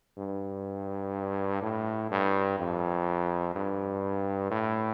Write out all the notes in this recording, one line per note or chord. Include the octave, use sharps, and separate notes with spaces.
G2
A2
G2
F2
G2
A2